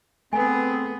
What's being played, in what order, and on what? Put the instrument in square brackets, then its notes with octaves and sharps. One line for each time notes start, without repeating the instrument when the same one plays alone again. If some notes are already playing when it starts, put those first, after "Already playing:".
[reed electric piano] A3 A4 B4 [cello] B3 G#4 [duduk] C4 [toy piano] G#5